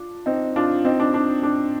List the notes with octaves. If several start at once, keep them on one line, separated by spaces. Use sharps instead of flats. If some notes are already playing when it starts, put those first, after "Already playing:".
Already playing: D4 F4
C4 D#4
D4 F4
C4 D#4
D4
D4
D4